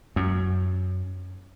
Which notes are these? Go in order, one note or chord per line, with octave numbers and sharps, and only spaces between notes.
F#2